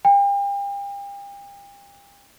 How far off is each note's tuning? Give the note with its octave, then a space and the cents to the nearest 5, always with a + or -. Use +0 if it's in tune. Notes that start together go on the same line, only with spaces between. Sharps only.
G5 +40